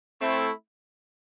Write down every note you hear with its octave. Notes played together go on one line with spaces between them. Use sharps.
A3 C4 E4